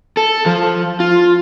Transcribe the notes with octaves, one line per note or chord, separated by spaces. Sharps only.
A4
F3
F4